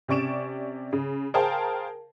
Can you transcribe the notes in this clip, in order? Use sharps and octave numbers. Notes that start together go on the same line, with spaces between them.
C3 C#4 D5 C#6 D7 E7
C#3
G#4 A#4 C5 F5 G5 A5